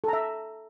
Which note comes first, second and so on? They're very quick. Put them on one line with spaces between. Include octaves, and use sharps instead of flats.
A4 A#5 E5